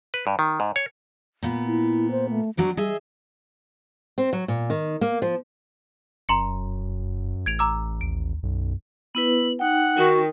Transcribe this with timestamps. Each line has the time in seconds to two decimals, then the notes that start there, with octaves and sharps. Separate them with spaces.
0.14 B4
0.27 G2
0.39 D#3
0.60 G#2
0.76 C#5
1.43 A#2 B3
1.67 E4
2.11 C5
2.30 A3
2.57 F#3 D4 F#4 C5
2.77 G3 G#4 D#5 E5
4.18 C4
4.33 F#3
4.48 A#2
4.70 D#3
5.01 A#3
5.22 F3
6.29 F1 F#2 A#5 C6 C#7
7.46 A1 G#6 D7 F7
7.59 A#5 D6 E6
8.01 D#2 D7
8.43 B1 F#2
9.15 B3 E4 B4 F#7
9.59 D#4 F#5 G5
9.97 D#3 F#4